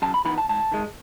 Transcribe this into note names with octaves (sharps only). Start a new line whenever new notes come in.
F#2 A5
B5
E3 B3 D#4 B5
A5
G#2 A5
D#3 G#3